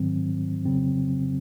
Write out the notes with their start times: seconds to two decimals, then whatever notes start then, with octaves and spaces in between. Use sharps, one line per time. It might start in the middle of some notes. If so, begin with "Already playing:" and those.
Already playing: G#2 D#3 F#3 C4
0.65 F2 C#3 F#3 C4